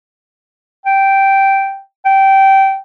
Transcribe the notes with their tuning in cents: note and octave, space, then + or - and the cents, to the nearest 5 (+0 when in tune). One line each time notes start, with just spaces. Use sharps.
G5 -5
G5 -15